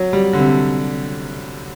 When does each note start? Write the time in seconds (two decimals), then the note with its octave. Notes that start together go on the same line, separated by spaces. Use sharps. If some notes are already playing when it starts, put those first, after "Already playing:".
Already playing: F#3
0.13 G3
0.33 D3
0.39 C3